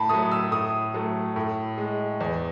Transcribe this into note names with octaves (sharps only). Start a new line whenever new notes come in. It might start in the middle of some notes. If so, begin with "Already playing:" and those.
Already playing: A2 A5 B5
F#3 A3 D#6
E6
A2 D#6
F#3 A3
A2
G#3
E2